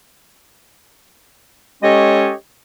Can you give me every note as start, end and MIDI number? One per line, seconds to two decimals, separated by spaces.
1.83 2.32 56
1.83 2.32 61
1.83 2.32 67
1.83 2.32 69
1.83 2.32 73
1.83 2.32 75